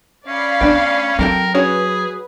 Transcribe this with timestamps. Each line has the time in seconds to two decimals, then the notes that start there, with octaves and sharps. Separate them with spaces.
0.27 C#4 D5 F5 B5
0.61 A3 B3 D4 G5
1.19 F#3 C4 A4 A#4 G5
1.55 C#4 F#4 G#4 B4 C#5